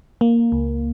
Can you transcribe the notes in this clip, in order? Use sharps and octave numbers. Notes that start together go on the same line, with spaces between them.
A#3
C#2